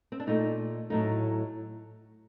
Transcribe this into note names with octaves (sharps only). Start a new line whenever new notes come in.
C4
D4
A#2 A3 D#4
A2 F#3 A3 D#4